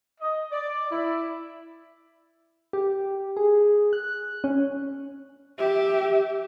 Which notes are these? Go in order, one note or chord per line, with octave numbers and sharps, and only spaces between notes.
D#5
D5
E4
G4
G#4
F#6
C#4
G4 E5